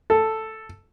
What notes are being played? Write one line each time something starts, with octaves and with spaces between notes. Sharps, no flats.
A4